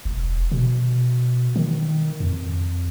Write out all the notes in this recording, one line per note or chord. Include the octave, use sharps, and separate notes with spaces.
E1
B2
D#3
F2